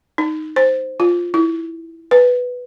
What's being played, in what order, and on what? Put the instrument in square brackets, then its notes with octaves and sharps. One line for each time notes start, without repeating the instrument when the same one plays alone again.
[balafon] D#4
C5
F4
E4
B4